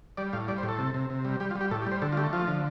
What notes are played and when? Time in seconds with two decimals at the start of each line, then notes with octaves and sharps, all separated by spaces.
0.17 G3 D5
0.33 A2 F5
0.48 G3 D5
0.58 C5
0.63 A2
0.69 A4
0.79 C3
0.94 C3
1.10 C3
1.25 G3
1.40 G3 G4
1.51 F4
1.55 G3
1.61 G4
1.71 A2 A4
1.82 G4
1.87 G3 C5
2.02 D3 A4
2.12 F4
2.17 A3 G4
2.33 F3 F4
2.48 D3